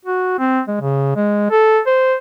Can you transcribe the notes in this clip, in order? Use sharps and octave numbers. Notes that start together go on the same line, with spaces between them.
F#4
C4
G#3
C#3
G#3
A4
C5